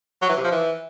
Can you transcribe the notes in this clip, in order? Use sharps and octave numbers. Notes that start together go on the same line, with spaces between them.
F#3
E3
C3
F3
E3